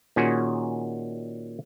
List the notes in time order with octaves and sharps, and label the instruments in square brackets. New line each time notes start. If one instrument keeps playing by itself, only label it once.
[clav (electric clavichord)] A#2 D#3 C#4 F#4 G#4